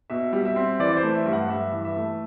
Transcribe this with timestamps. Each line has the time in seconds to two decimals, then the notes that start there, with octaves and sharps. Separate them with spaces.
0.10 B2 E5
0.33 G3
0.45 E5
0.56 C4
0.80 E3 D5
0.97 C5
1.03 A3
1.15 E5
1.26 G2
1.33 F#5
1.49 G2 E5
1.72 E3
1.85 E5
1.97 A3